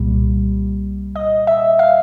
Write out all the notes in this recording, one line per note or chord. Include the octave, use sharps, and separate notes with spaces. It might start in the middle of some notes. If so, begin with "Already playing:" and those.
Already playing: C2 A#2 G3
D#5
E5
F5